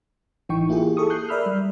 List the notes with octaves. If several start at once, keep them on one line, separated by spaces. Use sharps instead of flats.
A1 E3 D#4 G5 C#6
A#3 E4 F4 G4 G#4
G#4 A4 C#6 D#6
D#6 F#6 G6 C7
A#4 D5 E5 B5 E6 F6
G3